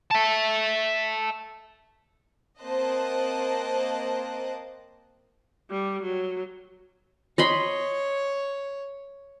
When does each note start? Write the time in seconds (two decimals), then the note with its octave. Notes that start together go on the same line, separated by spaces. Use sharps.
0.11 E5 A5
2.62 A#3 C4 C5 D#5 A5 F#6
5.70 G3
6.03 F#3
7.38 C#5 D#5 B5 C6